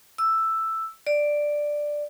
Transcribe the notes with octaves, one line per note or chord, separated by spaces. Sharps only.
E6
D5